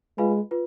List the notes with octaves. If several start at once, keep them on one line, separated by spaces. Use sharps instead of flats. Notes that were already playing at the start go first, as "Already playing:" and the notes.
G#3 F4 B4 F5 G#5 B5
F4 B4